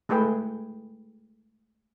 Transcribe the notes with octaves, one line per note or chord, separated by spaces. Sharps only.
G#3 A3 G#4 B4 G5